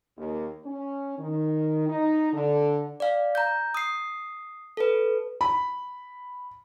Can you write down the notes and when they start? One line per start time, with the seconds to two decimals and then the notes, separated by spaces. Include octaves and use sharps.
0.17 D#2
0.65 C#4
1.19 D#3
1.89 D#4
2.33 D3
3.00 D5 F5
3.35 A#5 G6
3.74 D#6 C7
4.77 A4 B4
5.41 B5